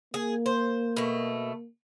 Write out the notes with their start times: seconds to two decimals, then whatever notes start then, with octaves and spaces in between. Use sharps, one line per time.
0.14 A#3 G#4
0.46 C5
0.97 B2 A3